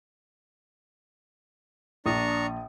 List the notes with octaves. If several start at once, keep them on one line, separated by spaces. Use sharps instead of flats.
A#1 D4 A#5 C#6 D#6